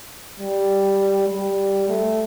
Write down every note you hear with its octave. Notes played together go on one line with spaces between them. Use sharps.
G3
G3
A3